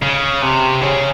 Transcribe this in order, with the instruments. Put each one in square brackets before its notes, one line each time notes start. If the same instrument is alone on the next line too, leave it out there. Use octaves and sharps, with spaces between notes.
[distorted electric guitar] C#3
C3
C#3